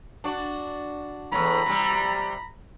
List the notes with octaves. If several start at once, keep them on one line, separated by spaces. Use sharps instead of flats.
D4 F#4
E2 A2 A#5 B5
C3 G3